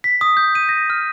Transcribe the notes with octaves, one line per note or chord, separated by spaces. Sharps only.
B6
D#6
G6
D#7
A#6
F6